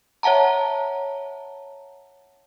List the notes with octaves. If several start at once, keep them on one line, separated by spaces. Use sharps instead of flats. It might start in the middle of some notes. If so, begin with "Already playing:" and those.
C#5 E5 F#5 A5 A#5